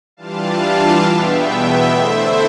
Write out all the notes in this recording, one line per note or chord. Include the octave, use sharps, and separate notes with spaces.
E3 G3 D4 F4 F5 A5
E2 B2 B3 E5 G5
E5 G5
D3 A3 E4 C5 E5